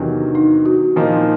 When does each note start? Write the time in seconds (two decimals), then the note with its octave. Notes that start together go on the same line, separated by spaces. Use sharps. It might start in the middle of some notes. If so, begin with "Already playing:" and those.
Already playing: E2 C3 D#3 F#3 D4
0.35 D#4
0.66 F#4
0.96 A#2 F3 A#3 D#4 E4